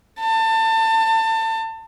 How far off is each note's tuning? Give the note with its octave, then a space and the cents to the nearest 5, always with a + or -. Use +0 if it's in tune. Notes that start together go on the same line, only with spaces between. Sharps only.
A5 +25